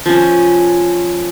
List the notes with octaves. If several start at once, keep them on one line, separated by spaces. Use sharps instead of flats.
F3 C#4